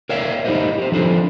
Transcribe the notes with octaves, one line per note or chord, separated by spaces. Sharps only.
A#4 C#5 D5 E5 F5 G5
D#4 E4 G4 B4 C5 D#5
G4 C5
F3 D4 E4 A4 C5